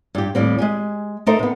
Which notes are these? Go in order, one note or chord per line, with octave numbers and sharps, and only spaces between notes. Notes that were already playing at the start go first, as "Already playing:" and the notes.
G2 G4
D#2 A2 G3 C4
G#3 G4 G#5
A3 D#4 A4 A#4 C5
C3 B3